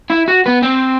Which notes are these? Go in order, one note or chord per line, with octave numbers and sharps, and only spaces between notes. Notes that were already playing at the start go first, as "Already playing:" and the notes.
E4
F#4
B3
C4